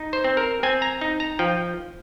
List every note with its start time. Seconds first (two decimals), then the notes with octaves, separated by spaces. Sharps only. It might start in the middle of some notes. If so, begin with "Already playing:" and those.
Already playing: D#4
0.13 C5
0.24 C4
0.37 A#4
0.63 C4 G#5
0.82 A#5
1.01 D#4
1.20 A#5
1.39 F3 G5